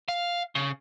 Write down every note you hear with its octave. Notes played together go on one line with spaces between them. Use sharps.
F5
C#3